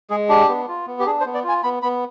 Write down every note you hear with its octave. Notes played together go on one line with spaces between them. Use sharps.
G#3 G#4
D4 G4
B3
F4
B3
G4
D4 G#4
C5
B3
D5
F4 G#5
B3 B5
B3 B5